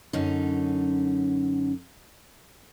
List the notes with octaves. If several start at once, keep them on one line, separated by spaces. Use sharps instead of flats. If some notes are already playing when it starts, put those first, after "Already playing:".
F#2 D3 C#4 D#4